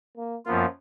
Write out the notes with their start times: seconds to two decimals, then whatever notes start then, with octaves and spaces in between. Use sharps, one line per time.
0.17 A#3
0.45 F#2 F3 A#3 B3 F4